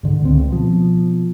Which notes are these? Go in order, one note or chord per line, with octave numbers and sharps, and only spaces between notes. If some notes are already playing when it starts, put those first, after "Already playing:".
G#2 D3
C#2 C4
B2 F3